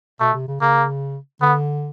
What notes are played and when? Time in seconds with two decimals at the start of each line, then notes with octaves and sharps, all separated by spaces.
0.20 B2 A3
0.34 C3
0.48 C#3
0.61 C#3 A#3
1.41 D3 B3